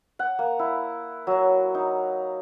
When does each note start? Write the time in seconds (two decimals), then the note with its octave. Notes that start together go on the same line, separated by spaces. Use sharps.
0.19 F#5
0.39 A#3
0.59 E4
1.27 F#3
1.75 D#4